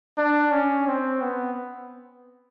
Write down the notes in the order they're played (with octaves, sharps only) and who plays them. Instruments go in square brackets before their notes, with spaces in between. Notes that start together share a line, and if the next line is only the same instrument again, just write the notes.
[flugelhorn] D4
C#4
C4
B3